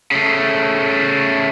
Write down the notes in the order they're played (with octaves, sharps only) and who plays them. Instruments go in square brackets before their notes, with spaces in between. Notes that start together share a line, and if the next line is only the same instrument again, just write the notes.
[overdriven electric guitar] C#3 A3